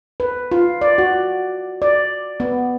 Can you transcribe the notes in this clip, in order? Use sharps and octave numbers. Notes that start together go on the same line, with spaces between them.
B4
F4
D5
F#4
D5
B3